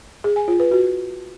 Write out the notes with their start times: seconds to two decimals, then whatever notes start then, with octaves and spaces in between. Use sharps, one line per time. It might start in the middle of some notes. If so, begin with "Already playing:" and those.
0.24 G#4
0.36 G#5
0.48 F4
0.60 B4
0.71 F#4